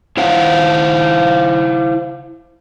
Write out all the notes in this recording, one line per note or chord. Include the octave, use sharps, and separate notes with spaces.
E4 C5 F5 F#5